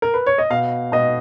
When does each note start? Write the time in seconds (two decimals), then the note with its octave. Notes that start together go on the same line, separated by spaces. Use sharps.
0.02 A#4
0.14 B4
0.26 C#5
0.38 D#5
0.50 B2 F5
0.92 B2 D#5